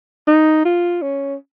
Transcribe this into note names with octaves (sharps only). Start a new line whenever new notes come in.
D#4
F4
C#4